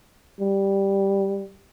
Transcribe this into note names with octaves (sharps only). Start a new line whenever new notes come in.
G3